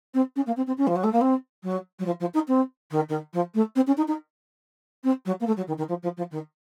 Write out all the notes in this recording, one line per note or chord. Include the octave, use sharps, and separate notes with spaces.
C4
C#4
A#3
C4
C4
C#4
F3
F#3
A3
A#3
C4
F#3
F#3
F3
F3
D#4
C4
D#3
D#3
F3
A3
C4
C#4
D#4
D#4
C4
F#3
A#3
A3
F#3
D#3
D#3
F3
F3
F3
D#3